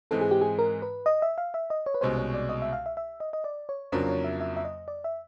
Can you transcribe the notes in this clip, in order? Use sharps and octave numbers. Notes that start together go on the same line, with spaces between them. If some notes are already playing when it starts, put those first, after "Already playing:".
G#2 E3 G#3 C4 A4
G#4
G4
G#4
A#4
B4
D#5
E5
F5
E5
D#5
C#5
B4
C2 B2 G#3 C#4 C5
C#5
D5
D#5
E5
F5
E5
E5
D#5
D#5
D5
C#5
F2 C#3 F#3 A#3 D4 C5
C#5
E5
E5
E5
D#5
D5
E5